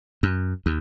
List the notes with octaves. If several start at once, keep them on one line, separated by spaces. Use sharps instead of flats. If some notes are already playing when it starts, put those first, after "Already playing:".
F#2
D#2